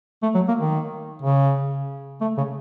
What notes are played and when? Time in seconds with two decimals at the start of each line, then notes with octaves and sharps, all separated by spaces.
0.23 A3
0.35 F#3
0.48 A#3
0.60 D#3
1.22 C#3
2.21 A3
2.38 C#3